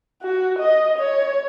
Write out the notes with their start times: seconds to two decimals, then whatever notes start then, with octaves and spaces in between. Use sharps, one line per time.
0.22 F#4
0.59 D#5
0.98 C#5